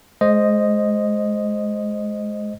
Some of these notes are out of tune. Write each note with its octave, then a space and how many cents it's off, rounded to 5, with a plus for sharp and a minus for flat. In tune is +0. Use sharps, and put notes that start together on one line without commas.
G#3 +30 C5 +0 D#5 +0